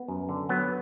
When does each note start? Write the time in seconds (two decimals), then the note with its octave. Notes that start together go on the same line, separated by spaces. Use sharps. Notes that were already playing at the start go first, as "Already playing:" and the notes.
Already playing: B3
0.08 F#2
0.29 D3
0.49 F#3 B3